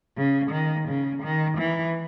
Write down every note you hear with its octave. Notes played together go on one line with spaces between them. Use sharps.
C#3
D#3
C#3
D#3
E3